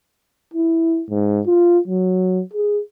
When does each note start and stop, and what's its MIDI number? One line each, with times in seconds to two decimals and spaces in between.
0.54 1.03 64
1.10 1.41 44
1.46 1.79 65
1.88 2.42 54
2.53 2.81 68